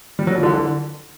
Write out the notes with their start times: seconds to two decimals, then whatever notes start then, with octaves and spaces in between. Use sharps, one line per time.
0.19 G3
0.27 F#3
0.35 F3
0.43 D3 E3
0.53 D3